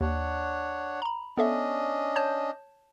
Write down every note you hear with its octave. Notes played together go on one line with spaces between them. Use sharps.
D#2 D4 C#5 F#5
A#5 B5
B3 C#4 D4 A4 D#5 E5
C#5 A5 G6